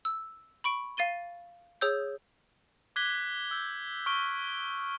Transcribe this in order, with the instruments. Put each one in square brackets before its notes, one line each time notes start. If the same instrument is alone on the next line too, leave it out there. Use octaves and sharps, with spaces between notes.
[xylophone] E6
B5 C#6 D7
F5 A6 D#7 G7
G#4 C#5 D#6 E6 G6
[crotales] D6 F#6 G#6 B6 G7
E6 G6
C#6 F6 D7 G7